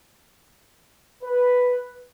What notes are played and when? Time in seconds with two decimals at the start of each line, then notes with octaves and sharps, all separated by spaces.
1.23 B4